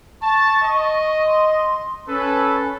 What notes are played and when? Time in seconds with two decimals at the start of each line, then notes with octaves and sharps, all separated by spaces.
0.22 A5 C#6
0.62 D#5
1.26 C6
2.07 C#4 A4 B4